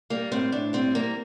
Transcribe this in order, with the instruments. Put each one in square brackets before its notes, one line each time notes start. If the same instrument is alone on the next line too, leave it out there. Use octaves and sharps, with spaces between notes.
[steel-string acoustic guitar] G3 A#3
A2 C4
A2 D4
G3 C4
G3 A#3